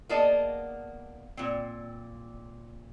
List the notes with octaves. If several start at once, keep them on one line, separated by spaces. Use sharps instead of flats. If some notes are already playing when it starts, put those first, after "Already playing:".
A#3 B3 G#4 D5 D#5 A5
A#2 C4